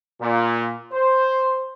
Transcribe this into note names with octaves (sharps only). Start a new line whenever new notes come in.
A#2
C5